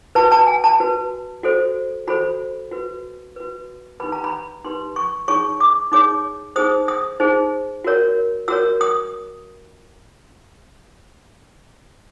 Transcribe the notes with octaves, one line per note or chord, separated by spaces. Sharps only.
F#4 B4 A5
A5
G#5
A5
F#4 B4
F#4 A4 C5
F#4 A4 C5 B5
F#4 B4
F#4 B4
D#4 G4 B4 B5
A#5
B5
D#4 G4 B4 C6
C#6
D#4 G#4 C#5 C#6
D6
D#4 G#4 C#5 D6
D#4 G#4 C5 D#6
D#6
D#4 G#4 C5
F#4 A#4 C#5
F#4 A#4 C#5 E6
D#6